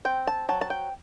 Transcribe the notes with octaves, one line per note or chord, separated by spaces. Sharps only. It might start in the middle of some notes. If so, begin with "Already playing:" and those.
C4 G5
A5
F#3 A5
A5
G5